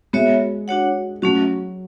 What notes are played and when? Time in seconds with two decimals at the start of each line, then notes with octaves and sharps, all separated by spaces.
0.13 G#3 B3 F#4 C#5 E5
0.68 D4 F#4 C#5 F#5
1.22 F#3 A3 C#4 F#4